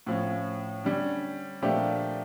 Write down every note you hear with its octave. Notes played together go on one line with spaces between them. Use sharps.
A2 F3 C#4
D3 G3 C#4
A#2 F3 A3 D4 G4